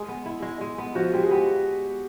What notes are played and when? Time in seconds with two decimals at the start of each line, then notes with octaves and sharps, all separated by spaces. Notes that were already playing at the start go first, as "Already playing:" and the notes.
Already playing: G#3 G#4
0.08 B3
0.26 E4
0.42 G#3
0.61 G#3
0.78 B3
0.95 F3 F#4
1.14 G#3 G4
1.23 G#4
1.31 B3 G4